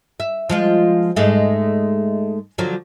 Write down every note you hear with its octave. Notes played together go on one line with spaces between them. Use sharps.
E5
F3 G#3 F4
G#2 G#3 A3
D3 F3 F#3